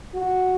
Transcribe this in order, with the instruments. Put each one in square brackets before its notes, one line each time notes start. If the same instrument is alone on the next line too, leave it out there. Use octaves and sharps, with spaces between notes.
[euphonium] F#4